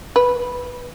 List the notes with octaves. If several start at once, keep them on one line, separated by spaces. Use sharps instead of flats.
B4